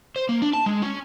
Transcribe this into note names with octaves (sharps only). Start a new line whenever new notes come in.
C5
A#3
D4
A5
G#3
C#4